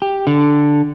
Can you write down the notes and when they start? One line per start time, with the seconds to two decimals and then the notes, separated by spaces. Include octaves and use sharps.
0.02 G4
0.27 D3